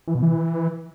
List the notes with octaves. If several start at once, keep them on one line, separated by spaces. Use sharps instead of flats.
E3
B2
E3